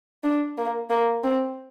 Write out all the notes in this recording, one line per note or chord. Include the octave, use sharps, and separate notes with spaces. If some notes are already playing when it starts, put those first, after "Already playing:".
D4
A#3
A#3
C4